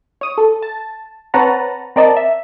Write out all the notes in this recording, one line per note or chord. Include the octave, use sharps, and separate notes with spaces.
C#5 D#6
A4
A5
C4 B4 C#5 F#5 A5 A#5
C4 A#4 D5 D#5 A5
E5